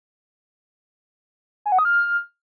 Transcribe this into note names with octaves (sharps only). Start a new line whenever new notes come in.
G#5
F#5
D#6
F6